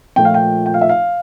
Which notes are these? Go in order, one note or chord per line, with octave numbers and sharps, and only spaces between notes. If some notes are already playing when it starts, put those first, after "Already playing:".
A#2 F3 A3 G5
F5
G5
G5
F5
E5
F5